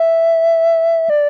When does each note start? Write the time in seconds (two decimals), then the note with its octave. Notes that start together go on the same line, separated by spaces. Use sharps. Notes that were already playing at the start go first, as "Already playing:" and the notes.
Already playing: E5
1.10 D5